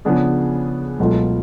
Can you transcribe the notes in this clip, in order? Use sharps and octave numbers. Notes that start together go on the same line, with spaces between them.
C#3 F3 B3 D4 G#4
C#2 B2 F#3 A3 F4